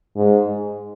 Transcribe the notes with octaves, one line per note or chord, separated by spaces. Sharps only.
G#2